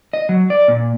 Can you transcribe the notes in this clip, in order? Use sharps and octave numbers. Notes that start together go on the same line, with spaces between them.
D#5
F#3
D5
A#2